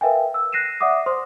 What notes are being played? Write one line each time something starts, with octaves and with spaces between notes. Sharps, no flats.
A#4 B4 E5 F5 G5 G#5
E6
F#6 A#6 C7 D#7 E7
D5 E5 F#5 D6 D#6
C5 C6 D#6